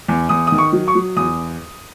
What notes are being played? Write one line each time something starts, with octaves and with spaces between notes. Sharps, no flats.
E2
E2 D#6
D#3 D#6
C#6
F#3
C#6
F#3
E2 D#6